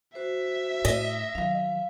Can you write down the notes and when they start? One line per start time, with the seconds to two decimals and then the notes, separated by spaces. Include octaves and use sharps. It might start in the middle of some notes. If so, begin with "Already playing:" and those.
0.15 F#4 C5 E5
0.85 A2 D#5
1.35 D#3 F#3 F5